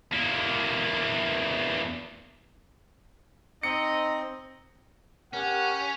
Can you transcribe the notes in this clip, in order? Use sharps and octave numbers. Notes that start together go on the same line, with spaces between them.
E2 A#3
C4 D#4 D#5 C#7
C#4 G4 A#4 F#5